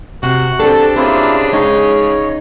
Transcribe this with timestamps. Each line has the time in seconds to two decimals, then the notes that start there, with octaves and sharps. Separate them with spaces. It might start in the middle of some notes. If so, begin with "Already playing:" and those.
0.23 C3 F#4
0.60 C4 D4 G4 A4
0.96 C#3 A#3 C4 E4 F4
1.53 G#3 D#4 C#5